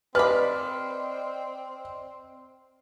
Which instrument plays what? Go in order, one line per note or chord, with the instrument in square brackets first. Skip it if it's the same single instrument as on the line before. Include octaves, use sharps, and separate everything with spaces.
[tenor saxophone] C4 [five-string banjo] B4 B5 [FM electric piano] D5 D#5 [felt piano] F6